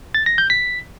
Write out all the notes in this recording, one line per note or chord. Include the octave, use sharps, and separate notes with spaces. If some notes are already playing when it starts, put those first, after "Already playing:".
A6
A#6
G6
B6